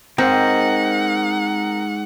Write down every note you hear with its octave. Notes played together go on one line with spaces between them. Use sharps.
G#2 C4 A#4 F#5 G5